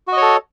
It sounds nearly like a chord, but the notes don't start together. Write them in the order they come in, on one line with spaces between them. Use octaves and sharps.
F#4 D#5 C#5 A4